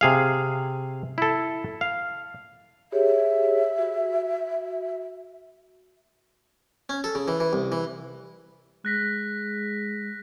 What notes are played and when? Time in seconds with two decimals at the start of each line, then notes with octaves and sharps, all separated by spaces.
0.01 C3 G#4 F5
1.18 E4 A4
1.81 F5
2.92 G4 G#4 C#5 E5
3.78 F#4
6.89 C#4
7.04 A4
7.15 C#3
7.28 E3
7.40 E3
7.53 C2
7.72 E3
8.85 G#3 F#6 A#6 B6